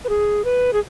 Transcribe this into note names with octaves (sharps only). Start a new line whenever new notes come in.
B4
G#4
B4
G#4